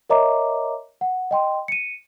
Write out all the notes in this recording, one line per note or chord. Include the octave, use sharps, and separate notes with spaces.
A#4 C#5 D#5 E5 A#5 D6
F#5
D#5 G5 C6
C#7 D#7